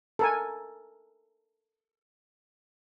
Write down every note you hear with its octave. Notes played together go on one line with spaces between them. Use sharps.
A4 A#4 G#5